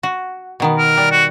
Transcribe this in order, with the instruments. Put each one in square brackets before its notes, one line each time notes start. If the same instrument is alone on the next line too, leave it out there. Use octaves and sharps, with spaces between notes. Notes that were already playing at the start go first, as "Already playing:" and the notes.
[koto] F#4
B2 D#3 B3
[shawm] A#4
[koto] G3
[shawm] F#4